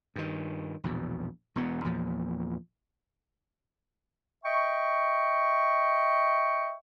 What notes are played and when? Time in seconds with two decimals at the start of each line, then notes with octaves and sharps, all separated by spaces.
0.16 G2 D#3
0.84 A#1 E2 B2
1.56 E1 E2 B2 B3
1.84 E2 A#2 F3
4.44 D#5 E5 G5 C#6